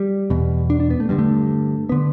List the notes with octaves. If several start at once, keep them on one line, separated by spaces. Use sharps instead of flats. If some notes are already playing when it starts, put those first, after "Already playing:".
Already playing: G3
E2 B2
D4
D4
B3
A3
G2 D3 G3
A3
D3 B3